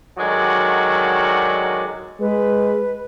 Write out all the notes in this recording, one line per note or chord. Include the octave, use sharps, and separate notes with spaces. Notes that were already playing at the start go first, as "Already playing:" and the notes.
D3 D#3 F#3 G#3 F#4 D5
G#3 B4